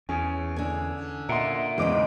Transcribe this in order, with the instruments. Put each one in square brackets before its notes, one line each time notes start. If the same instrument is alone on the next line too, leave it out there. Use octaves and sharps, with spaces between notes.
[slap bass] E2 [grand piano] C#4 G#4
[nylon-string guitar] D3 G#5
[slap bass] A#2 [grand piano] D#5 A#5 [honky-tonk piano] E5 F#5 C6
[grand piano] B1 [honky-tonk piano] E2 D6 D7 [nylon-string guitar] C#3 G#3 C5